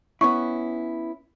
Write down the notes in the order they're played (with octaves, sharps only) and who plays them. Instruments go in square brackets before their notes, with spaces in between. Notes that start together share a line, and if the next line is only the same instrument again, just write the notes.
[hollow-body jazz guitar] B3 C#4 E4 [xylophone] C#6